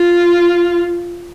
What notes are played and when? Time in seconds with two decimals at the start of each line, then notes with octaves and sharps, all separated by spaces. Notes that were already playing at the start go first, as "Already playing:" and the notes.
Already playing: F4